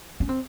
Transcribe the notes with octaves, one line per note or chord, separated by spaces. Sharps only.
C#4
C4